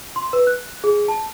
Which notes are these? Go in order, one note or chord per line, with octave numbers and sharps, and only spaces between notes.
C6
B4
F#6
G#4
A5